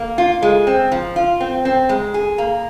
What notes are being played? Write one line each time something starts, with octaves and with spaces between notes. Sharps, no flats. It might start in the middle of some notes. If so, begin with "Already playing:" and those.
Already playing: A#3
F4
G#3
C4
F3
F4
C4
C4
G#3
G#4
A#3